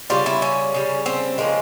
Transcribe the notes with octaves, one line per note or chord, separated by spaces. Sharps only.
C#3 G3 F4
E4
C#4
C#3 G3
C4
C#3 F3 G#3 A#3